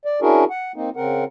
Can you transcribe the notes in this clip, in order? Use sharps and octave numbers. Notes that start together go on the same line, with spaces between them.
D5
C#4 D4 E4 F#4 G#4 A#4
F#5
A#3 C4 D#4
C#3 C4 A#4 F#5